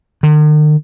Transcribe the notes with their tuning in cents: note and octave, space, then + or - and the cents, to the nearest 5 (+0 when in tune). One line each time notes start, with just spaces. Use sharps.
D#3 -45